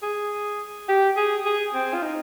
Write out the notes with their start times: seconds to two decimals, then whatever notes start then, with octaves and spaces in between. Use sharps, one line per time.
0.02 G#4
0.89 G4
1.17 G#4
1.45 G#4
1.74 C4
1.94 F4
2.02 D#4